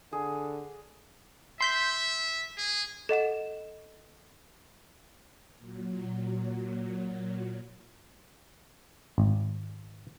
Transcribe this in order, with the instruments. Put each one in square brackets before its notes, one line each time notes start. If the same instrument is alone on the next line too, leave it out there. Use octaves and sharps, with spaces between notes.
[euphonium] D3 [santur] G#4
[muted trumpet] E5 [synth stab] C6 G6 B6
[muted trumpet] G#4
[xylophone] A4 D#5 F#5 E7
[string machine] A#2 F#3
[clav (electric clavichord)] G#1